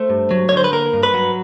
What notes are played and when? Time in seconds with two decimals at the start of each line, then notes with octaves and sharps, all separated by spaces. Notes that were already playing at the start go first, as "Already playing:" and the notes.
Already playing: A3 C5
0.10 G2
0.31 F#3
0.49 C#5
0.52 D3 C5
0.64 B4
0.72 A#3 A#4
0.93 G2
1.03 B4
1.14 F#3